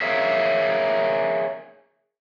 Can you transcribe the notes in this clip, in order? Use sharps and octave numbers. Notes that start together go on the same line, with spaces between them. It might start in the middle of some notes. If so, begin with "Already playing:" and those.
G#4 A#4 C#5 E5 F5